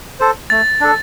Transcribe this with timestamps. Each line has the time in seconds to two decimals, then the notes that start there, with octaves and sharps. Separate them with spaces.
0.20 A4 C5
0.50 A3 A6
0.81 D4 A4